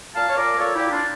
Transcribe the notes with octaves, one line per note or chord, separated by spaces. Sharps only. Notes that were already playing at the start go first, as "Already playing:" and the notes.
A#2 F5 A5
C#5
A#2 A#4 D5
A#2 A4 C#5
E4 G4
A#2
D4 F4